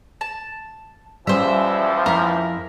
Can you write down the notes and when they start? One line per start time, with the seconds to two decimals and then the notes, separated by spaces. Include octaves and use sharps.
0.21 A5
1.27 C#2 E3 F3 G3 C#4 G#4 C5 E5
2.06 F2 E4 A#4 B5